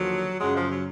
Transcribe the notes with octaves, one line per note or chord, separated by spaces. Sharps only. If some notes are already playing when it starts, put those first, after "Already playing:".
Already playing: D#2 D3 F3 F#3
F#2 C#3 F3 F#3 G#3
F3
F#3